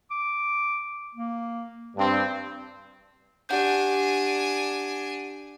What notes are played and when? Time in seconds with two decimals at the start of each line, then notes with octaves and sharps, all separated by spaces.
0.11 D6
1.15 A#3
1.97 G2 C4 D4
3.49 D4 G4 F#5 G#5 G6